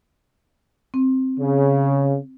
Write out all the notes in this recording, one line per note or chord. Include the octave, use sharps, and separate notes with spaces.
C4
C#3